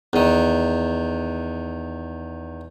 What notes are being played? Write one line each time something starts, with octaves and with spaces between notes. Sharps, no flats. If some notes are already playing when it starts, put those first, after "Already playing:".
E2 D#3